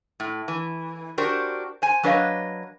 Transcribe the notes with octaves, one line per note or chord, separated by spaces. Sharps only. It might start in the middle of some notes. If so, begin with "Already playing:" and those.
A2
E3
D4 F#4 G4 A#4 C5
C5 G#5
F#3 D4 B4 C#5 D#5 F5